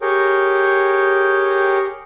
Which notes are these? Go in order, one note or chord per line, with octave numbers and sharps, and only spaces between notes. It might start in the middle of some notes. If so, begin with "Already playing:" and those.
G4 G#4 A#4 C#5 G5